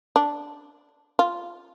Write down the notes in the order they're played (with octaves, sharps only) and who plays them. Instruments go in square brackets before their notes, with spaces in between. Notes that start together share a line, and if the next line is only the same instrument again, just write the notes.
[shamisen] D4
F4